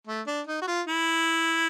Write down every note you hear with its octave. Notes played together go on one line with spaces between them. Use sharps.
A3
D4
D#4
F#4
F4
E4